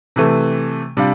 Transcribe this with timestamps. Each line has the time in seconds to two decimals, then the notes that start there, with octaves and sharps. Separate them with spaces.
0.16 C3 E3 A3
0.97 C3 G3 D4 F4